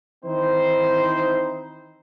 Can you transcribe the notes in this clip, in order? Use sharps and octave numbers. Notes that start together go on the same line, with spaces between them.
D#3 E3 C4 D#4 E4 C5